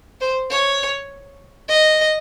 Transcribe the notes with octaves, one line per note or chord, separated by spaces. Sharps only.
C5
C#5
D#5